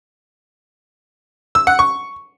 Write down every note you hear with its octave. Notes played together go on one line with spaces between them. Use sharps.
E6
F#5
C#6